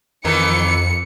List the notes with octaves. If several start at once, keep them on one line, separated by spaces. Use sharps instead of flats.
F2 D#3 E3 C#7